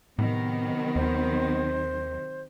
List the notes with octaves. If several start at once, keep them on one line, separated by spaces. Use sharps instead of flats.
A2 C3 D#3 F#3 B3
D#2 C5